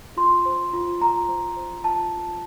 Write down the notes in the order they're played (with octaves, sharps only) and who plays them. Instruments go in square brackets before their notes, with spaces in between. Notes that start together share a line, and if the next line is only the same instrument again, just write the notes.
[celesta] F4 C6
C5
F4
F4 A#5
C5
C5
F4 A5
F4